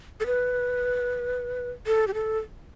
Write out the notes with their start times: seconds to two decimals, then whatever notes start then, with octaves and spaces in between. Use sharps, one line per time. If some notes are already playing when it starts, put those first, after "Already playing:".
0.20 A4
0.26 B4
1.87 A4
2.08 G4
2.14 A4